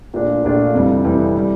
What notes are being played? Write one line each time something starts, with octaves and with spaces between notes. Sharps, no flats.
A#1 A#2 A3 D4 F4
A#1 A#2 A3 D4 F4
F1 F2 E3 G3
F1 F2 E3 G3
E3 G3